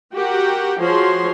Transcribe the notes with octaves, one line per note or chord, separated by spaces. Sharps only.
F#4 G4 A#4 F#5 G5
F3 F#4 G#4 C#5 C6